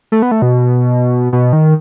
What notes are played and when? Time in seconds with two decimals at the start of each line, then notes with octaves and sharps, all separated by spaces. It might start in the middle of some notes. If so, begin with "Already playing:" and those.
0.12 A3
0.22 B3
0.31 A3
0.42 B2
1.33 B2
1.53 D#3